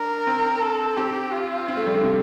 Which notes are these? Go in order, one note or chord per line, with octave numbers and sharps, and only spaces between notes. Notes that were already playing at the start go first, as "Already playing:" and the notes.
Already playing: D4 A#4
C4
A4
C4 G4
F4
C4
A3
G3
D3
C3